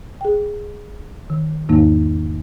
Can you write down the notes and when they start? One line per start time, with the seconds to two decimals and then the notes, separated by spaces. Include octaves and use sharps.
0.21 G#4 G5
1.30 D#3
1.69 E2 G#2 D#3 A#3 D#4